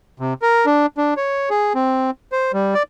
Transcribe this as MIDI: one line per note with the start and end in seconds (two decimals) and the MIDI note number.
0.20 0.34 48
0.42 0.66 70
0.66 0.86 62
0.98 1.14 62
1.17 1.49 73
1.50 1.73 68
1.75 2.11 60
2.32 2.52 72
2.53 2.74 55
2.74 2.83 74